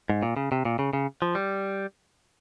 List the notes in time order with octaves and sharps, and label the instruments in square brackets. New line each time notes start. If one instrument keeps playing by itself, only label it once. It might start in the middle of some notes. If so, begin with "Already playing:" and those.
[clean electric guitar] G#2
A#2
C#3
C3
A#2
C#3
C#3
F3
G3